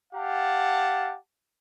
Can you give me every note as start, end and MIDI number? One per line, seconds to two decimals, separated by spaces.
0.14 1.16 67
0.14 1.16 77
0.14 1.16 78
0.14 1.16 81